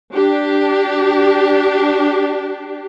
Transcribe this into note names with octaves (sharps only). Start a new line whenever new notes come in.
D4 G4